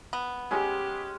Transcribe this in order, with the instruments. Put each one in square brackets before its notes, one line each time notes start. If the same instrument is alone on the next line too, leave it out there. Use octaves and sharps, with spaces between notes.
[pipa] B3
[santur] G#3 C#4 [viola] G4